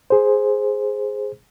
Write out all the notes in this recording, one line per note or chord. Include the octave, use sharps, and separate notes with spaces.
G#4 C5